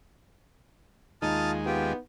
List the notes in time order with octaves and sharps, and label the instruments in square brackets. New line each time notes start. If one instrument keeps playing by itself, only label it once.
[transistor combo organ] D#2 G#3 [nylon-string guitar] D#4 [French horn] F4 [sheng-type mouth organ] A5 D#6 F6
[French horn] B3 [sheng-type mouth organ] F4 G4 G5